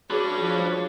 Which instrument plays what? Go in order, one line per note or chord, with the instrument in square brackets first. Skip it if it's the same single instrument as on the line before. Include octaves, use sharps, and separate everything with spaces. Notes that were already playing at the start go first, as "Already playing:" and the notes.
[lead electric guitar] D4 B4 [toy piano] F#4 G#4 D6 [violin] C#5
[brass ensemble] F3